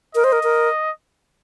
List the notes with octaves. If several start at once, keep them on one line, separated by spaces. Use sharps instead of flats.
A#4 D#5
C5
A#4
A#4